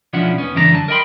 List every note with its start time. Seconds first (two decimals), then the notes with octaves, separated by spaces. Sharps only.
0.13 B1 F3 C#4 D4 E4 F#5
0.38 D#2 B3 C#4
0.55 C#2 F#2 E3 D4 A#4 A#5
0.72 D3 F#3 A5
0.88 A#4 D#5 G5 B5 C6